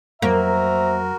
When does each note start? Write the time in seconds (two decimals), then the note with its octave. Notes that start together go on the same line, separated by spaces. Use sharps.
0.22 F2 F#3 A#3 F#4 A#4 C5 E5 A#5